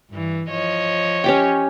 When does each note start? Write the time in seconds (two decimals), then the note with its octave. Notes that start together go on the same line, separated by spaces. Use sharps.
0.10 G2 E3
0.50 F3 C#5 D#5
1.24 C#4 G4 G5